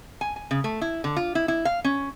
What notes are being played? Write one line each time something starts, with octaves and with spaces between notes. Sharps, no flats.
G#5
G#5
C#3
A3
E4
D3
F4
E4
E4
F5
C#4